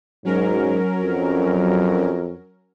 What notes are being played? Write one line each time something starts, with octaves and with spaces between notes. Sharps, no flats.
G#2 F#3 C#4 A#4
F2